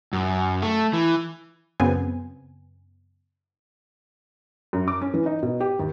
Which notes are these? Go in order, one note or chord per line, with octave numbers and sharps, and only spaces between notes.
F#2
A3
E3
F#2 C#3 B3 C4 G#5
F#2
D6
C#4
E3
D#4
B2
G4
D#2